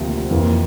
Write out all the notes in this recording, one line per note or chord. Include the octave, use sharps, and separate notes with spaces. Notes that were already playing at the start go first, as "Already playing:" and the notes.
Already playing: D2 C3 F3 A#3
F2 E3 A#3